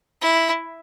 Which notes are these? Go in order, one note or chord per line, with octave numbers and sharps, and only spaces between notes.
E4